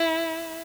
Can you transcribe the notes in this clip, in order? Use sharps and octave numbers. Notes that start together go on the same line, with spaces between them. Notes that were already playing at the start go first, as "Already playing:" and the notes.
Already playing: E4